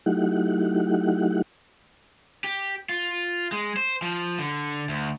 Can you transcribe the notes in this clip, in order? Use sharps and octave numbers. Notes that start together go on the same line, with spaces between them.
F#3 A3 D#4 E4 G4 F#5
G4
F4
G#3
C5
F3
D3
D2